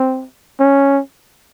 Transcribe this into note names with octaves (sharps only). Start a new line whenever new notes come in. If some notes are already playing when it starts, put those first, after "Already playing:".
Already playing: C4
C#4